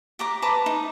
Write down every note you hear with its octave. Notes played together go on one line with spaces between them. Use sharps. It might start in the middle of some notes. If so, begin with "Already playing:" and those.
G4 A#5 D6
B4 A5 A#5 D6
D#4